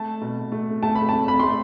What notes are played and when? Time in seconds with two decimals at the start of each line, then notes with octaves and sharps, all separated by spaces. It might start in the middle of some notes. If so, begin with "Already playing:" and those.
Already playing: A3 A5
0.21 B2
0.52 A3
0.83 A3 A5
0.96 B5
1.09 A5
1.13 A3
1.28 B5
1.39 A3 C6